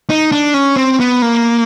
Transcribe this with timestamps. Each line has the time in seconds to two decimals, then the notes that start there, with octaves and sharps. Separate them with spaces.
0.10 D#4
0.32 D4
0.54 C#4
0.76 C4
1.00 B3
1.22 A#3